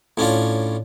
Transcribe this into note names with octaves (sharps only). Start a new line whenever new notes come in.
A2 C#4 D4 F4